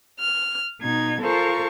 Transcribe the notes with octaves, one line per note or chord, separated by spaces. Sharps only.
F6
B2 D#4 G#6
F4 A4 A#4 C5 F5 C#6